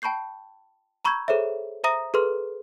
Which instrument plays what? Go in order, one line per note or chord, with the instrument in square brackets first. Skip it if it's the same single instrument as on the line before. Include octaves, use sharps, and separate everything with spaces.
[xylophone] G5 A5 B5 C#6 G6 C7
A#5 B5 C#6 E6 G6 G#6
G#4 A4 C5 C#5 E5
C5 E5 A#5 D#6 A#6
G#4 A4 B4 C6 F6